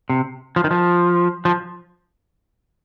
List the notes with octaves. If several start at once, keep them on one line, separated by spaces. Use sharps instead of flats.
C3
F3
D#3
F3
F3